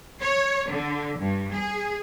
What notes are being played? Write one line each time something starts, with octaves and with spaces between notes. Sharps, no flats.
C#5
D3
G2
G#4